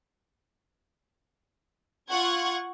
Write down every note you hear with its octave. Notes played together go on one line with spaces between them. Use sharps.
F4 F#5 C#6 G#6